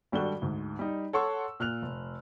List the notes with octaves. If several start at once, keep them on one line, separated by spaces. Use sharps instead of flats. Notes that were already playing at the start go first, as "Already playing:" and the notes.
G#1 G3 D4 F#4 A4 G7
D2 G#2
G3 D#4
A4 C#5 F#5 C6 C#6 E6
A#2 F6 F#6 F7
F1